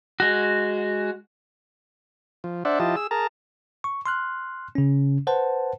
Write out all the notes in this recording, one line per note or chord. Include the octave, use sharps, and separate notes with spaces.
G#3 F#4
F3
D4 C5 D5 E5 F#5
F3 E4 F4 G4 D#5 A5
G#4 E6
G#4 A#4 A5 A#5
C#6
C6 F6 F#6
C#3 C#4
B4 C5 F#5 A5